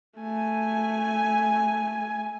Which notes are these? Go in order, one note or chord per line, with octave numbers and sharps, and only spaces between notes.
A3 G#5